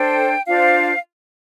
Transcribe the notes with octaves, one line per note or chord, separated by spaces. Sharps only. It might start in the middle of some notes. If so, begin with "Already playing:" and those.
Already playing: D4 A4 C5 G5
D4 F4 C5 F5